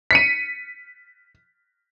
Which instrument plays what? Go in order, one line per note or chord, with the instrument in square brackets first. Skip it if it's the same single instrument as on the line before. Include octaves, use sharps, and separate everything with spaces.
[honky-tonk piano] B6 C#7 D#7